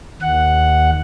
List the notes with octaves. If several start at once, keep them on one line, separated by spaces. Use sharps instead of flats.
D#2 F#5